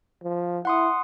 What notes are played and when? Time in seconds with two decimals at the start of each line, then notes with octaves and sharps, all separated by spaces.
0.24 F3
0.65 E4 F#5 C6 D#6